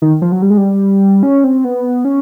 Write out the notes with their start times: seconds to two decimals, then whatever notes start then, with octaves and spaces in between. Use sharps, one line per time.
0.02 D#3
0.22 F3
0.32 F#3
0.42 G3
0.50 G#3
0.57 G3
1.23 C#4
1.44 C4
1.64 B3
2.05 C#4